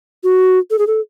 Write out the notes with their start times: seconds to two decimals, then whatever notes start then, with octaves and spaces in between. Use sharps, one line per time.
0.24 F#4
0.71 A4
0.79 G#4
0.87 A4